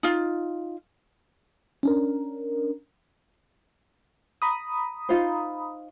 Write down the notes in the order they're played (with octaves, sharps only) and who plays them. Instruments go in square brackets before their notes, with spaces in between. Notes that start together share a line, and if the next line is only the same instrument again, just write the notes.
[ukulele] D#4 F4
[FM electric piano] C#4 D4 A#4
A#5 B5 D#6
[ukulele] D#4 F4 C5